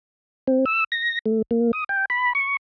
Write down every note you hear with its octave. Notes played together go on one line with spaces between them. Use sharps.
C4
E6
A#6
A3
A#3
D#6
G5
B5
C#6